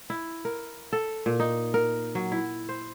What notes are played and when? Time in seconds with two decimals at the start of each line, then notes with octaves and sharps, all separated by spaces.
0.10 E4
0.45 A#4
0.93 A4
1.26 A#2
1.40 D#4
1.74 A#4
2.15 F#3
2.32 E4
2.69 C5